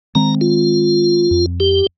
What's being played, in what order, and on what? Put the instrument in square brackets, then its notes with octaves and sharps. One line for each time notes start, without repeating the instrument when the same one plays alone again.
[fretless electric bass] D#3 G#3 C4 [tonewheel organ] A#5
[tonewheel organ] F4
[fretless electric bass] F2
[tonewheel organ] G4